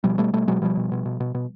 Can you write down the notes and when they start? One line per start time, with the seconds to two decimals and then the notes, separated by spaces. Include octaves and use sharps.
0.04 B2 F3 G3
0.18 B2 G3 A3
0.33 B2 G3 A3
0.47 B2 F#3 G#3
0.62 B2 F3 G3
0.77 B2
0.92 B2
1.05 B2
1.20 B2
1.35 B2